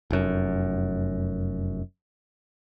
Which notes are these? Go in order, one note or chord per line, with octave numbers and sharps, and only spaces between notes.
F1 F#2